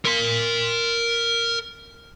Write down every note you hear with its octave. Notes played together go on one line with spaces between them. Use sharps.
A#4 C6